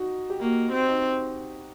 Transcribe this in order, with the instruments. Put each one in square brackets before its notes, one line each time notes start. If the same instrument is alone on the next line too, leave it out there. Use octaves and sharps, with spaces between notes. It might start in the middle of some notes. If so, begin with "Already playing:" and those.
Already playing: [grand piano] D#4 F#4
G4
[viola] A#3 [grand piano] F#4
[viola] C4
[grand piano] D#4